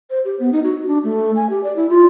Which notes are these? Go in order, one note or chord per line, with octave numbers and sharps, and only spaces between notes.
C5
G4
B3
D#4
F#4
D4
A3
G#5
G4
D5
E4
F4